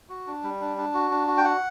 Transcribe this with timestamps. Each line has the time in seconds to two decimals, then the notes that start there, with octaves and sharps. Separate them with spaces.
0.09 F#4
0.27 D4
0.43 G3
0.61 D4
0.78 D4
0.94 F#4
1.11 D4
1.27 F#4
1.37 G5
1.44 F#4 F#5